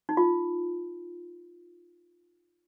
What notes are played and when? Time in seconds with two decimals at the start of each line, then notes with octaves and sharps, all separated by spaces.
0.09 D#4
0.17 F4